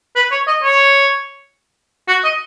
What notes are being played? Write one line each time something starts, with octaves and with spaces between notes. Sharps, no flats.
B4
C#5
D#5
C#5
F#4
D#5